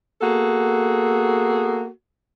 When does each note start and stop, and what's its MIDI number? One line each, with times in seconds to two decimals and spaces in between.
0.21 1.86 58
0.21 1.86 59
0.21 1.86 66
0.21 1.86 68
0.21 1.86 69